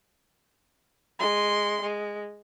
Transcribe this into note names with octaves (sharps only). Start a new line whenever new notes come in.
G#3 C6
G#3